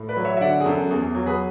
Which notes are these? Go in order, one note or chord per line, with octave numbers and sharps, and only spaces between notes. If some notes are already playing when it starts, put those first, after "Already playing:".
Already playing: A2
B4 D5
F#3
C#5 E5
E5
D3 D5 F#5
G#4
F#2 A4
E2 G#4
G#4
F#3
G#4 B4